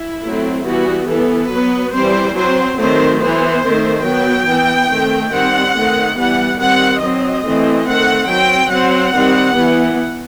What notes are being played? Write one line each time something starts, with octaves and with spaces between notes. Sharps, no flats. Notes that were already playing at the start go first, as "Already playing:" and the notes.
Already playing: E4
F#3 A3 C4
E3 G3 B3 F#4
E3 B3 A4
F#3 B3 B4
E3 G3 C4 C5
F#3 C4 C5
D#3 F#3 A3 C4 C5
E3 B3 C5
D#3 A3 C4
F#3 B3 G5
E3 B3
D#3 A3 C4
D#3 G3 C4 F#5
D#3 A3 C4
E3 G3 B3 F#5
D#3 G3 C4 F#5
F#3 C4 D#5
E3 A3 C4
D#3 A3 C4 F#5
F#3 C4 G5
F#3 C4 F#5
D#3 G3 C4
E3 B3